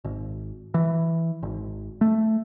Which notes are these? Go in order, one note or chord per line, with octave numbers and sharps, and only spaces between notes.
G#1
E3
G#1
A3